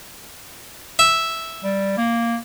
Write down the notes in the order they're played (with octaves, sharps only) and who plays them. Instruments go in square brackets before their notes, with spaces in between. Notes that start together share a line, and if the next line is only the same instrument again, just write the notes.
[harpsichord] E5
[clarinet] G3
A#3